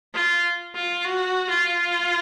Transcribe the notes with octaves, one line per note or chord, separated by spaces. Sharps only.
F4
F4
F#4
F4